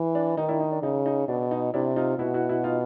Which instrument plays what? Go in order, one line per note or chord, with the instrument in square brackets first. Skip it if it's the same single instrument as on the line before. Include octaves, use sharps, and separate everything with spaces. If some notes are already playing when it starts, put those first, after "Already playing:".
Already playing: [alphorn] E3
[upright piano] D4
[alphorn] D#3 [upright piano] D#4
[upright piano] D4 E4
D#4
D4
[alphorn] C#3 [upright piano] D#4
[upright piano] D#4
[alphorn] B2 [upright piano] D4
[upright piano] D#4
[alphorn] C3 [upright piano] D4 E4
[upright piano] D#4 F4
[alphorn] B2 [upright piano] E4 F#4
[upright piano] E4 F#4
E4 F#4
D#4 F4